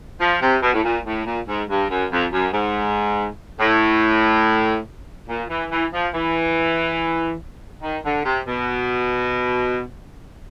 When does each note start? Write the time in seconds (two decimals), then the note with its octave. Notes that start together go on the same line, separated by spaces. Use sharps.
0.20 F3
0.41 C3
0.62 B2
0.74 A2
0.84 A#2
1.05 A2
1.25 A#2
1.48 G#2
1.69 G2
1.90 F#2
2.11 F2
2.33 F#2
2.53 G#2
3.60 A2
5.29 A#2
5.49 E3
5.71 E3
5.92 F3
6.14 E3
7.82 D#3
8.05 D3
8.25 C3
8.47 B2